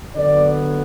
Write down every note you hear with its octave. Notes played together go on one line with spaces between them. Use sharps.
D3 F#3 B3 D5